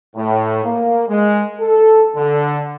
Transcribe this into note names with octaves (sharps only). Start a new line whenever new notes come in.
A2
A#3
G#3
A4
D3